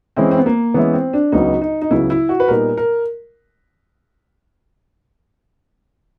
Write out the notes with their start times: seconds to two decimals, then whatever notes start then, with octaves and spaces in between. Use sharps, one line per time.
0.16 E3 G#3 C4 C#4 E4
0.31 C4
0.39 B3
0.46 A#3
0.74 E3 G#3 B3 C#4 E4
0.93 C4
1.13 D4
1.32 C#2 C#3 F#3 B3 D#4
1.62 D#4
1.82 D#4
1.90 C#2 C#3 F#3 B3 E4
2.10 E4
2.29 F#4
2.40 B4
2.48 A#2 G3 B3 D#4 A#4
2.77 A#4